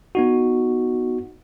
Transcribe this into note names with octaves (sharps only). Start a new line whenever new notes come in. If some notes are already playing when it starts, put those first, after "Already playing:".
B3 D#4 F#4